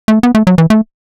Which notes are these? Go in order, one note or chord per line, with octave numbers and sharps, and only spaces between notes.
A3
B3
A3
F#3
E3
A3